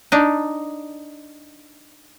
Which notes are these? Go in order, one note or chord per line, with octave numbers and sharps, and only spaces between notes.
D4 D#4